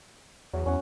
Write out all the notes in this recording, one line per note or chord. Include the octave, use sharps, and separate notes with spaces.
E2 F#3
E2 C#4 F#5